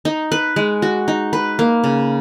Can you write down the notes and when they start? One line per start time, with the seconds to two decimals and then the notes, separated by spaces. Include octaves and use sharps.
0.05 D#4
0.32 B4
0.56 G#3
0.82 F#4
1.08 D#4
1.33 B4
1.59 A#3
1.84 C#3